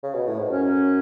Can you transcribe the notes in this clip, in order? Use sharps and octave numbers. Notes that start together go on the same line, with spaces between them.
C#3
B2
A2
G#2
F#2 C#4